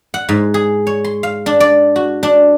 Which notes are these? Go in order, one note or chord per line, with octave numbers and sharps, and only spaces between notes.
F#5
G#2
G#4
C#5
C6
F5
D4
D5
F#4
D4